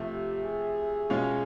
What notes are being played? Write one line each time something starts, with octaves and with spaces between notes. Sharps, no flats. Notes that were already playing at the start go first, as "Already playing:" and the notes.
Already playing: C3 F3 A3
G4
G#4
B2 G#3 C#4 F4